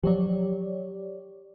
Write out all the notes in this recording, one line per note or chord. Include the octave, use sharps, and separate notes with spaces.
F3 F#3 G4 C#5 D5